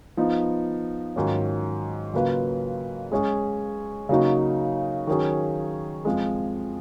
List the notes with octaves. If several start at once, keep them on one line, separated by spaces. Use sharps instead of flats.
F3 B3 D#4
G#2 D#3 F#3 C#4 F4
C#3 F#3 A#3 F4 B4
G#3 C#4 G#4
C#3 F#3 A#3 D#4 F#4
D#3 F#3 C#4 G#4
F2 F3 G#3